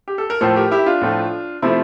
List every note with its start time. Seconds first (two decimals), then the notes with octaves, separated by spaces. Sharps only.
0.08 G4
0.18 A4
0.30 A#4
0.41 A2 F3 A3 A4 C5
0.56 G4 A#4
0.71 E4 G4
0.86 D4 F4
1.02 A2 F3 A3
1.62 C3 F3 A3 C4 E4